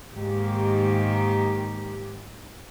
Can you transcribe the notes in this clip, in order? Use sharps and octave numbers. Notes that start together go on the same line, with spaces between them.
G#2 D#3 A#3 G4